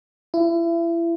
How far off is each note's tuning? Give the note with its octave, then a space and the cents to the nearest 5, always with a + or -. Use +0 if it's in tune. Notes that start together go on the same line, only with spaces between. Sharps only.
E4 +35